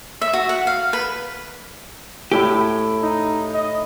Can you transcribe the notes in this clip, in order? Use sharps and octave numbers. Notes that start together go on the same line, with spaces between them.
E5
F#4
F#5
F5
B4
A2 E4 G4 E5
D#4
D#5